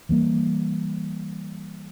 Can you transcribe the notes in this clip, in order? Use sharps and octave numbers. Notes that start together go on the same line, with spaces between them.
E3 G3 A#3